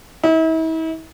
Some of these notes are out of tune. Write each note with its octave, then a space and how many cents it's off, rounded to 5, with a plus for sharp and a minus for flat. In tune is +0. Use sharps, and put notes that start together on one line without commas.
E4 -40